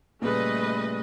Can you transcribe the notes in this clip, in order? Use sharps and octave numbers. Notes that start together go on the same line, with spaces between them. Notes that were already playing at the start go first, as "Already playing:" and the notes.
A#2 C#3 G3 A3 B4 D#5